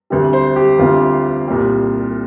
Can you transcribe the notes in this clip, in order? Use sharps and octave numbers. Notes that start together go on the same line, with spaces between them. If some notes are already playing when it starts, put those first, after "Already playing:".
D2 C3 G3
C5
G4
D2 C3 G3 F4
C2 A#2 G3